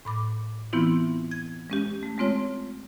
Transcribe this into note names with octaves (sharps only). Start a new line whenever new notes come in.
A2 B5 D6
E3 B3 C4 E4 F4
G#6
G#3 C#4 G4
A3
G#3 A3 C4 F4 C#5